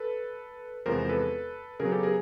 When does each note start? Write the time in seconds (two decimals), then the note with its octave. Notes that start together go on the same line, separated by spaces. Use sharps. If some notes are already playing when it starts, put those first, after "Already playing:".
Already playing: A4 B4
0.86 E2 C3 F3 G#3 B3 A#4 C5
1.09 A4 B4
1.80 C#3 F#3 B3 G#4 A#4
1.92 G4 A4
2.03 G#4 A#4